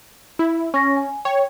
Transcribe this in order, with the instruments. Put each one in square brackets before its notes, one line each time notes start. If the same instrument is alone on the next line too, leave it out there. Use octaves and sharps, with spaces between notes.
[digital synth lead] E4
[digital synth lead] C#4 [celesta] C#6 A#6
[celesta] G#5
[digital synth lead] C#5 [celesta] G5